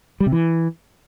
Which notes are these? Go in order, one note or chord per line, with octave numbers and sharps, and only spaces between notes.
G3
C3
E3